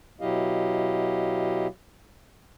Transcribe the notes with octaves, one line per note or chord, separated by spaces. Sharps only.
B2 F#3 E4 G4 D#5 F5